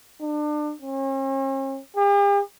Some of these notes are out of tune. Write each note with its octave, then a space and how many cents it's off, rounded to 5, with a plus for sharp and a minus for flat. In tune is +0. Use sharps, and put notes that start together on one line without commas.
D4 +30
C#4 -45
G4 +45